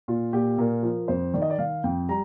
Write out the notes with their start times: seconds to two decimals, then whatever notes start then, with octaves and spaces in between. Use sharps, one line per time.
0.08 A#2 F4
0.33 A#2 G4
0.58 A#2 A#4
0.83 F3
1.08 F2 C5
1.34 D#3 D5
1.42 D#5
1.50 D5
1.58 D#3 F5
1.84 F2 G5
2.09 G3 A#5